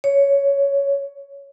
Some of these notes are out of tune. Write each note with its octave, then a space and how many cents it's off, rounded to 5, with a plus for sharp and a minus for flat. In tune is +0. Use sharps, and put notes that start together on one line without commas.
C#5 +10